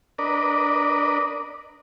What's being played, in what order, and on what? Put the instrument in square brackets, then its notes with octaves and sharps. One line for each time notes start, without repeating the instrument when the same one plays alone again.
[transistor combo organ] D4 A#4 B4 D5 D#5